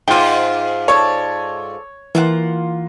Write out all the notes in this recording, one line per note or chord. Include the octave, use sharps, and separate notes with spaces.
G#2 F4 C5 F5 G5
A4 C#5 D5
E3 A#3 F4 F#5